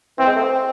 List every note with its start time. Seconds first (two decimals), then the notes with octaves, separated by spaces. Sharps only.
0.18 E3 C4
0.27 G#3
0.36 A3
0.44 C4